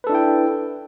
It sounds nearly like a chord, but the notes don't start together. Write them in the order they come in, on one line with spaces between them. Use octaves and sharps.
B4 A4 D4 E4 G5